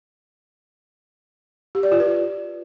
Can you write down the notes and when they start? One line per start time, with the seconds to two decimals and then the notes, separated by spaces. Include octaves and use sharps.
1.75 G4
1.83 D5
1.92 F4
2.00 B4